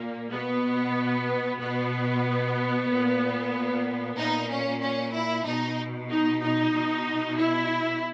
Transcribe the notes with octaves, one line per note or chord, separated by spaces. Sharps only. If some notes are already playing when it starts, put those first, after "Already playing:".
Already playing: A#2 A#3
B2 B3
B2 B3
A#2
A#2 D#4
C#4
C#4
E4
B2 D#4
D#4
D#4
B2
E4